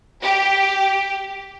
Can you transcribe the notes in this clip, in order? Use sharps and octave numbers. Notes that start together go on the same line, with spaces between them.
G4